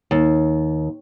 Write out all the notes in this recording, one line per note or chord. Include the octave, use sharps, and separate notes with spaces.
D#2